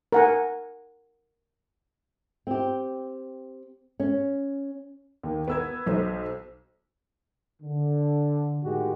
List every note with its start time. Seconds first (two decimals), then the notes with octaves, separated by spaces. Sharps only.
0.12 A#4 F#5 G#5
2.47 C4 G4
4.00 C#4
5.23 D#2
5.48 B3 E6 G#6
5.86 B1 C5
7.61 D3
8.64 A2 D#3 G#3 F#4 G4